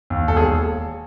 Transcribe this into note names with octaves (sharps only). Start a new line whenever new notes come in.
D#2
E1 A4
G#4